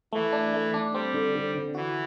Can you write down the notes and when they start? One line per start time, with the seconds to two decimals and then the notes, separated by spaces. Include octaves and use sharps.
0.13 E3 A3
0.33 D4
0.54 A3
0.74 D4
0.94 G3 C4
1.14 D3
1.35 D3
1.54 D3
1.75 E3 F#4